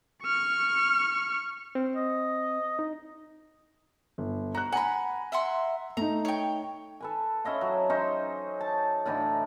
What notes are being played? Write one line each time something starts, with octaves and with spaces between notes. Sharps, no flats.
C#6 F6
C4
D#5
D#4
G1
F#4 A#5 F#6
F#5 G#5 A#5 B5
E5 F#5 C6
A3 D#4 A#5
C#5 G5
A4 B4 G#5
C#4 E4 D#5 F5
F#3
C#4 D#4 C5
A5
A2 D3 E3 D#4